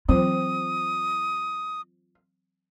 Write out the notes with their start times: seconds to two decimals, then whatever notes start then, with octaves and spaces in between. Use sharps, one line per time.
0.09 E3 F#3 C4 F4 D#6